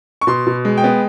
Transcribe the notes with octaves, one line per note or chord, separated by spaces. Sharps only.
C#6
B2 C6
B2
G#3
G5
B3